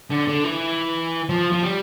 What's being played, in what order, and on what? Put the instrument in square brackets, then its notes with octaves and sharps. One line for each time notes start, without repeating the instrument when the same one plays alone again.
[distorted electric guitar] D3
D3
E3
F3
F3
G3